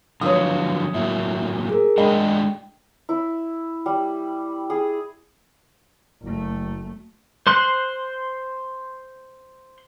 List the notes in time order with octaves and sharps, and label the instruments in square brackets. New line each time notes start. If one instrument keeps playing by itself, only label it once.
[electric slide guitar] D3 F3 F#3 [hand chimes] B4 F5 [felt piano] C#5 D#6
[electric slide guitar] A2 F#3 A#3 [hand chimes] E5
[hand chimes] G#4 A#4
[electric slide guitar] G#3 A3 D4 [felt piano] D#5 B5 [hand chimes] G5
[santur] E4
G3
G#4
[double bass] F#1 A3
[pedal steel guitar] C5 C6 F#6